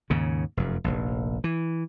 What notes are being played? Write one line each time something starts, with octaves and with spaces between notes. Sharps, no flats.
D#2 G#2 C#3
F1 F#2
F1 A#1
E3